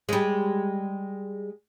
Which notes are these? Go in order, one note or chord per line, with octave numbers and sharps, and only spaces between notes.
G3 G#3